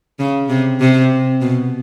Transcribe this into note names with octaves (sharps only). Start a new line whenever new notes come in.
C#3
C3
C3
B2